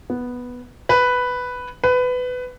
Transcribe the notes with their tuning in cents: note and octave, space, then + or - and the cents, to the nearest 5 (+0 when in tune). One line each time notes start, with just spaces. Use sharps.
B3 -5
B4 +5
B4 +20